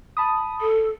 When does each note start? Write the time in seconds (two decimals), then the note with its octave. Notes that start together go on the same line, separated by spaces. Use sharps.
0.17 A5 B5 D#6
0.61 A4